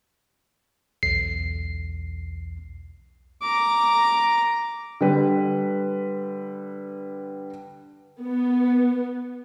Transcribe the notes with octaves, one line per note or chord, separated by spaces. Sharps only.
B1 E2 C7
A#5 D6
D3 G3 B4
B3